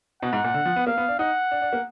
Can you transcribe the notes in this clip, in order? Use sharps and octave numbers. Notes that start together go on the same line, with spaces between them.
B2 F#5
G#2
A#2
D3
F3
B3
A#3 F5
B3
D4
D#4 F#5
D4
D4
A#3